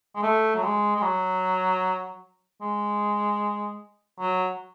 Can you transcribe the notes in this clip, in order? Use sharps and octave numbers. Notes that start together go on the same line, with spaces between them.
G#3
A3
F#3
G#3
G#3
F#3
G#3
F#3